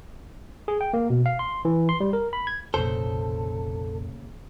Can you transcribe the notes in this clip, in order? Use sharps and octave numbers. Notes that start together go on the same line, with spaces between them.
G#4
G5
A#3
B2
F5
C6
E3
C6
G3
A#4
B5
G#6
F1 A#1 A#2 C#3 A4 C5